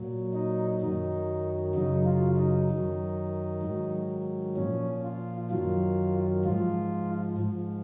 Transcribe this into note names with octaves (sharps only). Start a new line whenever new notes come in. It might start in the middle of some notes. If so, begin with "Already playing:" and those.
Already playing: A#2 F#3
D#4
F#2 D#3 F#3 D#4
F#2 C#3 F#3 D#4
F4
D#4
F#2 D#3 F#3
G#2 D#3 F#3
A#2 F3 C#4
F4
F#2 D#3 F#3 F4
G#2 F3 F4
G#2 F3